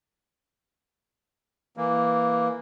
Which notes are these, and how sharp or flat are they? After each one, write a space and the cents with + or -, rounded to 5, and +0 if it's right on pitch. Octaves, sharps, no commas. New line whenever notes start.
E3 +0 A#3 +0